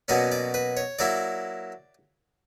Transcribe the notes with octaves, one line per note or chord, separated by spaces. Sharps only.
B2 F#3 A#3 C#4 D5
D5
B4
C#5
F#3 A#3 E4 D5